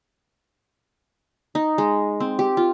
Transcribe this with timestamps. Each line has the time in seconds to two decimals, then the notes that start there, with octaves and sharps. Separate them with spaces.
1.55 D#4
1.78 G#3
2.20 C4
2.39 G4
2.57 F4